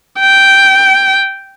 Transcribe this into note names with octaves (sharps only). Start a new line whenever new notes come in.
G5